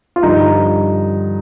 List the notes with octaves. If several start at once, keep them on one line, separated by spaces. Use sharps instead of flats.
F4
G2 D3 F3 D#4